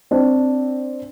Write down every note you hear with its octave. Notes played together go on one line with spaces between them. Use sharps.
C4 D4